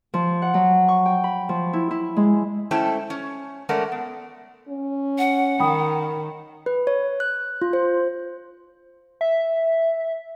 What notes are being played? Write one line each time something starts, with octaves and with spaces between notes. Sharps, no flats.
F3
F#5
F#3
C#6
G5
B5
F3
E4
E4
G#3
A3 C#4 E4 A4 C5 G5
C#4
G#3 A3 C#4 A#4 D5 F#5
B3
C#4
F#5
D#3 G5 B5 D#6
B4
C#5
F#6
F4
C5
E5